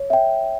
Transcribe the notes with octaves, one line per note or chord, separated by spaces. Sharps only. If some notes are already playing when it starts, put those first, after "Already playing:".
Already playing: C#5
E5 G5